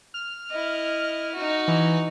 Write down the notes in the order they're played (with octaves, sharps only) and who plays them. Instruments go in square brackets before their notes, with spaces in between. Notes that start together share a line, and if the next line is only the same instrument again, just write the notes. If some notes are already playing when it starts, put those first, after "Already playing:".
[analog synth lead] F6
[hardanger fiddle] E4 D#5
D#4 F#4
[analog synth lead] E3